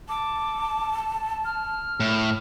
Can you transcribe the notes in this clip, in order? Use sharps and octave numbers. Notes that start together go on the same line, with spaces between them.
A5 D6
F6
A2